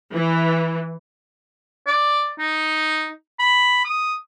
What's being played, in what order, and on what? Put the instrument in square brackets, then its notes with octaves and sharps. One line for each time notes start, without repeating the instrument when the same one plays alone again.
[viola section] E3
[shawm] D5
D#4
B5
D#6